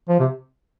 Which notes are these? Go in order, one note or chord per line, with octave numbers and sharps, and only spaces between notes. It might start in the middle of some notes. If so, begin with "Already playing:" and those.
F3
C3